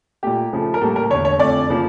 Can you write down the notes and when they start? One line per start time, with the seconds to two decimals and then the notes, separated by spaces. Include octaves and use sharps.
0.23 A#2 A3 G4
0.52 C#3 F3 A3
0.74 A#4
0.81 A2 G3 A#3 A4
0.96 A#4
1.10 E2 D3 A3 C#5
1.25 C#5
1.39 F2 D3 A3 D5
1.69 C#3 F3 A#3